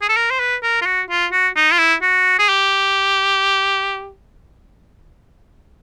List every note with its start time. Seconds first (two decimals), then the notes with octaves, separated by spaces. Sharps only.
0.02 G#4
0.09 A4
0.17 A#4
0.30 C5
0.40 B4
0.63 A#4
0.81 F4
0.86 F#4
1.10 F4
1.32 F#4
1.56 D#4
1.72 F4
1.78 E4
2.02 F#4
2.39 G#4
2.49 G4